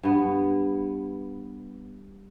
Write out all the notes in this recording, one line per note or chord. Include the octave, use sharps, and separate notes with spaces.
G2 B3